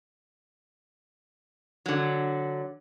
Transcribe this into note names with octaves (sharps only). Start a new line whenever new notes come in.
D3 F#3